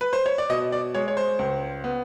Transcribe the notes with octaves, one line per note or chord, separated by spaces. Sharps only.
B4
C5
C#5
D5
B2 D#5
D5
G#3 C#5
C#5
C5
C#2
B3